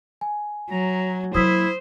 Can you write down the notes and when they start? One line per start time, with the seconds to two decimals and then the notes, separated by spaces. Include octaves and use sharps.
0.21 G#5
0.70 F#3 A#5
1.35 F#3 A#3 E4 C5 D#6 E6 B6